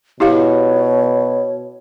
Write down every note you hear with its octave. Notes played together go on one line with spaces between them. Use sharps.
B2 E4 G4 C#5 F5